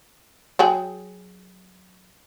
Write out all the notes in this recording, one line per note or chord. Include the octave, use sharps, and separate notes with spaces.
F#3 G#4 G5